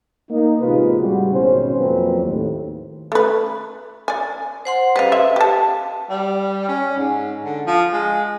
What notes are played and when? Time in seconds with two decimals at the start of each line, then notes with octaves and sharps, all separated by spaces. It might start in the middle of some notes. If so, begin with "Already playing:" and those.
0.29 A#3 D#4
0.61 A1 C3 G#3 F4 B4
0.98 A2 C#3 G3 F#4
1.34 G#1 B2 C#4 C5
1.77 F2 F#3 A#3 C4 B4
2.23 D#2 A2
3.12 A3 B4
4.08 D5 G#5
4.65 C5 F#5 C6
4.96 C#3 G3 B4 D#5 F5
5.12 E5
5.36 G4 A5
6.10 G3
6.68 C#4
6.98 G#2
7.45 D3
7.66 F3
7.93 G#3